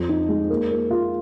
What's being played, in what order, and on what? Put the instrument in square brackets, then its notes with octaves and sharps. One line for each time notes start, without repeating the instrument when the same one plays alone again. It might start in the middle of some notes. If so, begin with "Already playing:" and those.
Already playing: [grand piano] F2
D#4
G#3
A#3
A#3
F4